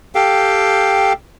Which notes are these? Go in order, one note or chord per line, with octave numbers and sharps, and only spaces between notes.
G4 A4 F5 G5